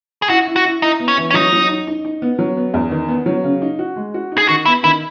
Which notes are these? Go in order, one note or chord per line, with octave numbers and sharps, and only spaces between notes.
G#4
E4 F#4
E4
F#4
E4
D#4 E4
B3
C#4
E3
C#4
F#3 D#4
F#3
D#4
D#4
D#4
B3
F#3
B3
E2
D#3
B3
F#3
C#3
D#4
F#4
G#3
F#4
D#4
G#4
D#3 F#4
B3 E4
D#3 E4